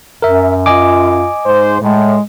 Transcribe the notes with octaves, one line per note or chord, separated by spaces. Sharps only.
F#2 A#4 E5
F4 D#5 G#5 D6
G#2 C5
A2 G#3